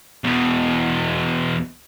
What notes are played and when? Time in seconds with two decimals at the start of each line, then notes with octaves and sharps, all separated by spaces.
0.24 E2 B2